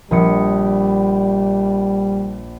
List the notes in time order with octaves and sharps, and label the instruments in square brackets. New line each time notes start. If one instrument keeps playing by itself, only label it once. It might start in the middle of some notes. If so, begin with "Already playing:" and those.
[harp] A#1 D#6 C#7 [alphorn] G3